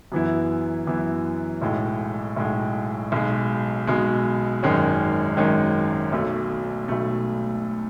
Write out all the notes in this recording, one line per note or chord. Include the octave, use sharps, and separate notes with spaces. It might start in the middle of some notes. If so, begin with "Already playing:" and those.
F#2 E3 B3 E4
F#2 E3 B3 E4
B1 A2 G#3
B1 A2 G#3
B1 B2 G#3
B1 B2 G#3
G#1 F#2 D#3 G#3 C#4
G#1 F#2 D#3 G#3 C#4
B1 B2 A3
B1 B2 A3